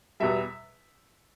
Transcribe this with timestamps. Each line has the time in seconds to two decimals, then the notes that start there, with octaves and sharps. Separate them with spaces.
0.20 E2 B2 G3 E5